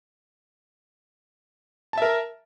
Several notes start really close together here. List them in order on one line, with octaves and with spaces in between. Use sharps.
A5 E5 A#4